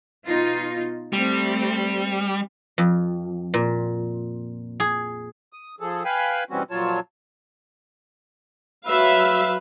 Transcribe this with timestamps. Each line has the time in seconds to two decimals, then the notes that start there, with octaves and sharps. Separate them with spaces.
0.25 B2 D#4 F4
1.13 G3 A3 C4
2.78 F2
3.54 A#2
4.80 G#4
5.53 D#6
5.80 F3 G#4 A4
6.05 B4 F5 G5 G#5 B5
6.51 B2 E3 G3 C4 C#4 F#4
6.71 F2 A#2 F#3 F4 C#5 A5
8.87 F#3 B4 E5 F5